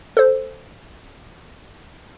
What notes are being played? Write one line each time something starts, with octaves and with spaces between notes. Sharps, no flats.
A4 C5